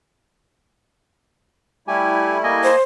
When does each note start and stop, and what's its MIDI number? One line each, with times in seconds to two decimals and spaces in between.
1.88 2.69 55
1.88 2.69 57
1.88 2.69 64
1.88 2.38 67
1.88 2.38 80
2.44 2.76 58
2.44 2.76 75
2.44 2.76 80
2.63 2.83 72